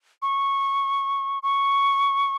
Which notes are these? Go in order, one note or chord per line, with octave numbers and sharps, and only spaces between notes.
C#6
C#6